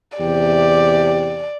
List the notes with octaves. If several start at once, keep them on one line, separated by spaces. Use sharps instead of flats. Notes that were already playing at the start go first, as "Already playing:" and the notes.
E2 C3 G4 D5